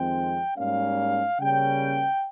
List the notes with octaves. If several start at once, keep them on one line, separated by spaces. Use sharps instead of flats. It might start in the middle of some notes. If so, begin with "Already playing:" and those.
Already playing: F2 D#3 G#3 C4 G5
G#2 G3 A#3 C#4 F5
C#3 G3 A#3 C#4 G5